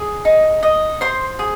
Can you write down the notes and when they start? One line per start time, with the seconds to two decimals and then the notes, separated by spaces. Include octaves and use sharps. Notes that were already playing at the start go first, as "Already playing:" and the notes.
Already playing: G#4
0.25 D#4
0.63 D#5
1.01 C5 C6
1.39 G#4